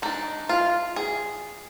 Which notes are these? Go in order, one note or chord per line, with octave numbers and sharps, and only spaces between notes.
G#3 D4 D#4
F4
G#4